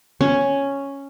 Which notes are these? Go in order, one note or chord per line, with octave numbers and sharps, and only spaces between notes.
C#4